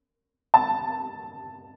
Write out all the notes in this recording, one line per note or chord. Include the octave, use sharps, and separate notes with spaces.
A5